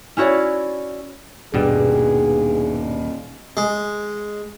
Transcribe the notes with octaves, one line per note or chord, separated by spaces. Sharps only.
C#4 E4 F#4 C#5 D5
D#1 G2 B2 G3 G#4
G#3